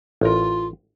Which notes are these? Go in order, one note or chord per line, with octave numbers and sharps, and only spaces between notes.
A1 F4 A#4